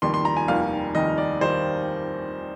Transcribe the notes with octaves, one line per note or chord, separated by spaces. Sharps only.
F1 D#2 D#3 G3 C6
C6
A#5
G#5
F1 D#2 D#3 G3 F5
F1 D#2 D#3 G3 D#5
D5
D#3 G3 C5